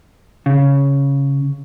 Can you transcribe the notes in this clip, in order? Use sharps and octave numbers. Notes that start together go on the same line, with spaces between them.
C#3